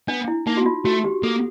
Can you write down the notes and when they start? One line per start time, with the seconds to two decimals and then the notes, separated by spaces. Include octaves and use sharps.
0.08 B3 D4
0.28 E4
0.47 A#3 D#4
0.57 F#4
0.66 F4
0.85 A3 F#4
1.04 G4
1.23 A#3 A4